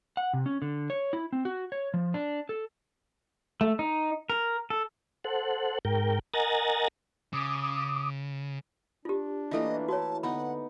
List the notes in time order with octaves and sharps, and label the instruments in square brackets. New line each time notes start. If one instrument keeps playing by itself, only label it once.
[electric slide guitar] F#5
C3
C#4
D3
C#5
E4
C4
F#4
C#5
F3
D4
A4
[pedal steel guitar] A3
D#4
A#4
A4
[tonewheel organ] A4 C5 F#5
G#2 A#4 G5
A#4 D#5 F#5 G#5 A#5 A6
[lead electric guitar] C#3 [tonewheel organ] D6 D#6
[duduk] D4 [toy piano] F4 G4
[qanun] E3 A3 A#3 [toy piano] F4 A4 [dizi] D#5
[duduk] E4 [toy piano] F#4 C#5 [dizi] A5
[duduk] D3 [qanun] B3 D#4 [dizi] F#5 [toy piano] B5